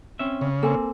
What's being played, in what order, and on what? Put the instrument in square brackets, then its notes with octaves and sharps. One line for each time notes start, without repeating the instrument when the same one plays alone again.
[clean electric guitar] C4 C#4 E5
[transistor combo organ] C#3
[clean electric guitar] A#3 C4 [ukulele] A4 G#5